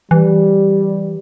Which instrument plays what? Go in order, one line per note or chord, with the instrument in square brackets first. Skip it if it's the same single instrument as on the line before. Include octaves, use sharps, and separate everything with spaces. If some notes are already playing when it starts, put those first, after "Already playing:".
[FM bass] E3 [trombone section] G3